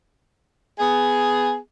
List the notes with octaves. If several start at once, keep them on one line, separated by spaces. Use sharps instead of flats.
B3 G#4